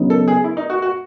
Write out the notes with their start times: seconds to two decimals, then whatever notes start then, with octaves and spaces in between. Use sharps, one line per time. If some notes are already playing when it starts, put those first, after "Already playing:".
Already playing: C#3 F#3 B3 D#4
0.10 A4
0.28 G#4
0.44 E4
0.57 D#4
0.70 F#4
0.82 F#4